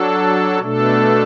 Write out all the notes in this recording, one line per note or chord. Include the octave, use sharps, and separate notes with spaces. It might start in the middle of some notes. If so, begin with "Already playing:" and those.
Already playing: F#3 D4 A4
B2 A3 D4 A4